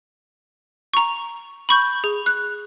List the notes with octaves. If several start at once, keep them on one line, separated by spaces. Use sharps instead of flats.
A#5 C#6
B5 C#6 G6
G#4
F#6